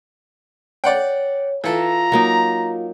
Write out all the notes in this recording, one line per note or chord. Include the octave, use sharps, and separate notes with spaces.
C#5 D5 F#5 G5
E3 F4 A4 F5 A#5
F#3 A#3 D#4